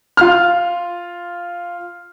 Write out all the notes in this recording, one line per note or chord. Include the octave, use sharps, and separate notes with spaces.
F4 F6